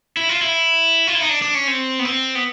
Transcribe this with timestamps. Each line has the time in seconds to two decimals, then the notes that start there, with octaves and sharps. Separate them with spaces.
0.17 E4
0.29 F4
0.41 E4
1.07 F4
1.15 E4
1.22 D#4
1.29 D4
1.42 D4
1.55 C#4
1.67 C4
1.99 B3
2.05 C4
2.35 B3